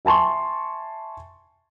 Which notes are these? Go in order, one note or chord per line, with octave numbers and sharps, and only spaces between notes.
E5 G#5 A5 C6 C#6